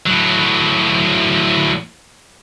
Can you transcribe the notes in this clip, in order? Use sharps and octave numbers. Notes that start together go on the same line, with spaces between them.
A2 F#3